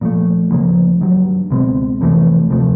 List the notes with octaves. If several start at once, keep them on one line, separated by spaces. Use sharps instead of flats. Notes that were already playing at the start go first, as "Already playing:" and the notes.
A#2 F3 A3
D2 C#3 F3 A#3
G2 D#3 F#3
C#2 B2 G#3 C4
F2 C3 E3 A3
D2 C3 F3 A3